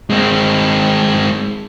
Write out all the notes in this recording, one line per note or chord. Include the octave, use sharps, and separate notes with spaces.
G#3 C4